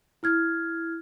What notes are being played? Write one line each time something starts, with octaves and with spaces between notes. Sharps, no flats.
E4 F6 G#6